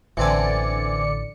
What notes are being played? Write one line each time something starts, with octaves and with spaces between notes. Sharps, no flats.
A1 D3 E3 C4 D5 G#5 C#7